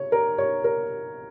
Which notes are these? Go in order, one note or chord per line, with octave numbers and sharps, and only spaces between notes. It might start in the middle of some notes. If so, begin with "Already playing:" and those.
Already playing: C#5
A#4
C#5
A#4